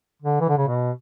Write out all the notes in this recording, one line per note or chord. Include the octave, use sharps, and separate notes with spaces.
D3
E3
D3
C#3
B2